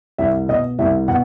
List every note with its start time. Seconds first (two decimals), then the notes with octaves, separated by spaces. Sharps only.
0.18 C2 E5
0.49 B2 D#5
0.78 C2 E5
1.08 B2 F#5